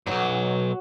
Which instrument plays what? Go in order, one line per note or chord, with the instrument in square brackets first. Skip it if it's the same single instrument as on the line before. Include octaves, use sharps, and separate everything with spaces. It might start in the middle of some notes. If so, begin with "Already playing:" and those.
[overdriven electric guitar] B1 E2 [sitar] F#3